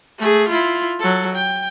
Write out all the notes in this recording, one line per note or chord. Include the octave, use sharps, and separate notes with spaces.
A3 G#4
E4 F4
F#3 A4
G5